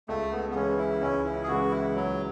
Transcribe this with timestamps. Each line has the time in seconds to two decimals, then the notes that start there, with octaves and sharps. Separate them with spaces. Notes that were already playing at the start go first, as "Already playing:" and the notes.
0.08 C#2 A3
0.32 B3
0.50 B3
0.55 C#3 E3 G#3 C#4
0.78 E4
1.01 C#2 C#4
1.25 E4
1.43 G#4
1.48 C#3 E3 G#3 F#4
1.71 E4
1.95 C#2 F#3